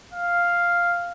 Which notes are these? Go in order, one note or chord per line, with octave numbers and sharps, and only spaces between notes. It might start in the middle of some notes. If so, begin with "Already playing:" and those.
F5